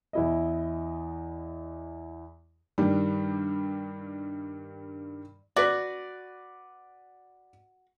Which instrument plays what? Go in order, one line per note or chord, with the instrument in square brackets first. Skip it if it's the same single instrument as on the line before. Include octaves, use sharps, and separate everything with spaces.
[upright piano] E2 E4 D#5
[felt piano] G2 D#3 G3
[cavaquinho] F#4 [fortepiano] B4 D5